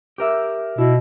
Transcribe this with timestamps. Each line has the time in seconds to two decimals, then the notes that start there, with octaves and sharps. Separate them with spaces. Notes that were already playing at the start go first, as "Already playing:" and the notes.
0.18 G4 A#4 E5
0.78 B2 E4